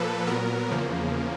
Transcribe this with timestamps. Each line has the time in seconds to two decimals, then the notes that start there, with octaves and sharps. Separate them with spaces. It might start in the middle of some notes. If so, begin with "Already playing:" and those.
Already playing: A#2 F3 A#3 A4 B4
0.27 A#2 F#3 B3 A#4
0.71 E2 C#3 F3 A#3